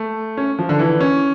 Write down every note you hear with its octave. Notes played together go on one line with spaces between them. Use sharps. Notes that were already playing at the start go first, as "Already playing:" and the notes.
Already playing: A3
C#4
F3
D3
E3
C#4